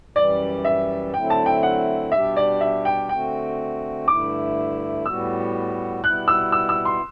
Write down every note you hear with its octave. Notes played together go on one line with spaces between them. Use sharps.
F#2 E3 G3 D5
E5
D3 F#3 A3 C4 E4 G5
A5
G5
F#5
B2 G3 D4 G4 E5
D5
E5
G5
D3 A3 C4 F#4 G5
G2 D3 A3 E4 D6
A2 G3 B3 F#4 E6
B2 G3 B3 E4 F#6
E6
E6
E6
C6